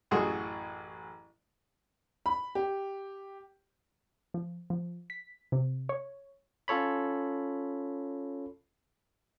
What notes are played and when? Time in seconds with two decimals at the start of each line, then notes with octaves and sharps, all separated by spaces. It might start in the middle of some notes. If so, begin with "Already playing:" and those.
0.11 A1 F#2 F#4 G#4 A4 C6
2.26 B5
2.55 G4
4.34 F3
4.70 F3
5.10 B6
5.52 C3
5.89 C#5
6.68 C#4 F4 A4 C#5 B5